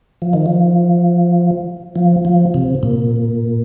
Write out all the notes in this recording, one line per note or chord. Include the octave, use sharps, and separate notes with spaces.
F3
D#3
F3
F3
F3
C3
A#2